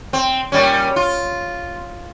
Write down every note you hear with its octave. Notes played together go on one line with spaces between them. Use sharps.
C4
A#2 G3 C#4
F4